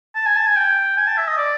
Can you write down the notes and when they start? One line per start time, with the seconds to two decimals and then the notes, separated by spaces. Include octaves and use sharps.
0.15 A5
0.26 G#5
0.36 A5
0.46 G#5
0.57 G5
0.97 G#5
1.07 A5
1.18 E5
1.28 D#5
1.38 D5